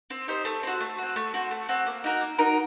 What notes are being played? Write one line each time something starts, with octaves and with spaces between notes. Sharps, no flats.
C4
D#4 G4 C5
A3
C4 F#4
A3
C4 F#4
A3
C4 F#4
A3
C4 F#4
A#3
D#4 F#4 A#4
A#3
D#4 F#4 A#4